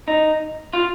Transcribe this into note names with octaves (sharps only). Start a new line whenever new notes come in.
D#4
F4